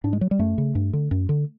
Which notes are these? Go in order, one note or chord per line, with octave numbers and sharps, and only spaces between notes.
G#2 D4
G#3
F#3
G3
F#2 A3
C#3
G2
D3
F#2
D3